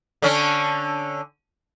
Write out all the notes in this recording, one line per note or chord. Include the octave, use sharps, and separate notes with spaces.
D3 C#4 D4